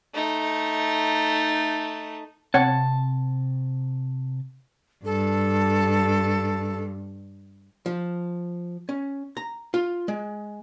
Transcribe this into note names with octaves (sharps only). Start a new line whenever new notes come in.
A3 D#4
C3 C4 C#5 F#5 A5
G2 A4
F3
C#4
A#5
F4
G#3